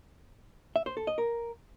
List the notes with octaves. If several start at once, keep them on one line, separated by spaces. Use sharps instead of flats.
E5
C5
A4
D#5
A#4